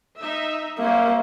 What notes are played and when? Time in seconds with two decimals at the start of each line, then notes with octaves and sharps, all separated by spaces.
0.19 D#4 E5
0.79 G3 A#3 C#4 C5 E5